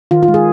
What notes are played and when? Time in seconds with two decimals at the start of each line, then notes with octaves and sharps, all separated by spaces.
0.11 D#3 F4
0.23 F4
0.28 G#3
0.34 G#4